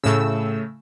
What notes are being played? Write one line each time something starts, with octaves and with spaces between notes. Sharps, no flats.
A2 C#3 A3 E6